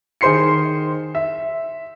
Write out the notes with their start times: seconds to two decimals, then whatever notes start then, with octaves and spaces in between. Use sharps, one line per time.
0.21 D#3 G#4 C5 C6 C7 C#7
1.15 E5